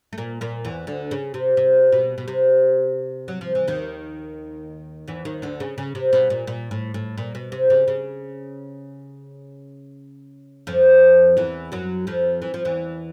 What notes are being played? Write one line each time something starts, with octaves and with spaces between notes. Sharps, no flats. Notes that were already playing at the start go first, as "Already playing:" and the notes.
A3
A#2 A#3
A#2 A#3
E2 E3
D2 D3
C#3
C3
C3
B2
B2
C3
F#3
F3
E3
D#2 D#3
E2 E3
D#2 D#3
D2 D3
C#3
C#3
C3
B2
A#2
A#2
A2
A2
A#2
B2
C3
C#3
C#3
F2 F3
E2 E3
F#2 F#3
F2 F3
E3
F3
E2 E3